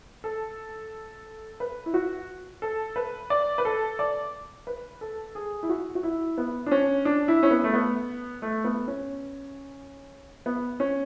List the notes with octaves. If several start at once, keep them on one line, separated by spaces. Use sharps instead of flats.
A4
B4
E4
F#4
A4
B4
D5
B4
A4
D5
B4
A4
G#4
E4
F#4
F#4
E4
B3
D4
C#4
D4
E4
C#4
B3
A3
B3
A3
B3
C#4
B3
C#4